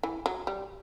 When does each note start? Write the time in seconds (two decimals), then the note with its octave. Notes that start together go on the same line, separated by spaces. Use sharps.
0.03 E3
0.26 F#3
0.47 G3